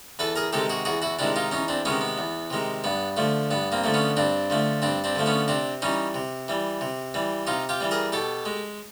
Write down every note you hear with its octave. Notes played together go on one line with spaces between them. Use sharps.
E2 A4 B4
G#4 A#4
C3 D#3 G#3 G4 A4
F#4 G#4
E2 F#4 G#4
E4 F#4
C3 D#3 G#3 D4 E4
D#4 F4
E2 C#4 D#4
C4 D4
C3 D#3 G#3 B3 C#4
B3
E2
C3 D#3 G#3
G2 B3
D3 F3 A3
G2 B3
A#3 C4
D3 F3 A3
B3 C#4
G2 C4 D4
D3 F3 A3
G2 C4 D4
C4 D4
D3 F3 A3
B3 C#4
C3 C4 D4
E3 G3 C#4 D#4
C3
E3 G3
C3
E3 G3
C3 D#4 F4
F4 G4
E3 G3
G#4 A#4
B2 G4 A4
G#3